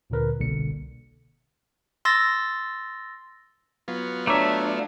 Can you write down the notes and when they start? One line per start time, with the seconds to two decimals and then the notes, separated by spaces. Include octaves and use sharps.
0.10 D2 A#2 D3 A#4 B4
0.39 G1 C2 B2 D3 A#3 C#7
2.05 C6 E6 A6 A#6
3.88 F#3 B3 F4
4.27 A3 D4 C#5 E5 A#5 D6